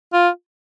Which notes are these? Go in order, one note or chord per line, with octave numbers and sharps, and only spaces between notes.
F4